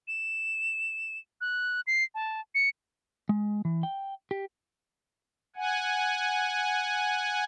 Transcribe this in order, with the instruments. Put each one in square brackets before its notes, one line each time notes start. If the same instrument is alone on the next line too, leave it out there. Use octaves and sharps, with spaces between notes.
[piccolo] E7
F#6
C7
A5
C#7
[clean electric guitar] G#3
E3
G5
G4
[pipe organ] F#5 G#5